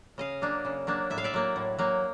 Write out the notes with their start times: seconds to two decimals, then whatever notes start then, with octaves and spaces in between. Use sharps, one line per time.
0.18 C#3 D#5 F5
0.42 F#3 A#3 D4
0.65 C#3
0.87 F#3 A#3 D4
1.10 A2 E5
1.18 F5
1.24 D5 E5
1.34 F#3 A#3
1.56 A2
1.79 F#3 A#3